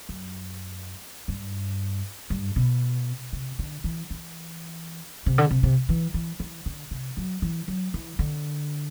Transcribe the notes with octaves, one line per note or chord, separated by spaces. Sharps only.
F#2
G2
G2
B2
C3
D3
E3
E3
C3
D3
C3
C3
E3
E3
E3
D3
C3
F#3
E3
F#3
E3
D3